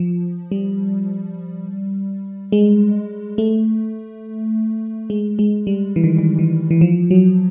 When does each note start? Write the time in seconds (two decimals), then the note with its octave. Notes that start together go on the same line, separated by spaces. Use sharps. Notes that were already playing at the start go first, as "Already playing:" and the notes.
Already playing: F3
0.52 G3
2.52 G#3
3.38 A3
5.10 G#3
5.39 G#3
5.67 G3
5.96 E3
6.04 D#3
6.18 D#3
6.39 E3
6.71 E3
6.81 F3
7.11 F#3